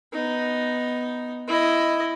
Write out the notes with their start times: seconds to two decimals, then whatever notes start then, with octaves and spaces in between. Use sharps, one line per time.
0.13 B3 D#4
1.48 E4 D#5